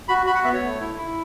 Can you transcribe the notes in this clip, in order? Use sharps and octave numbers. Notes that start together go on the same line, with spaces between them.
F#4 B5
F#4 B5
F#5
B3 E5
C#5
A3
E4
E4